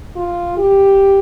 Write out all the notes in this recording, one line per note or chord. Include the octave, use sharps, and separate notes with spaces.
F4
G4